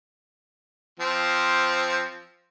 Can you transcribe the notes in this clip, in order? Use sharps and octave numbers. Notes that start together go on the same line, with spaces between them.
F3 C4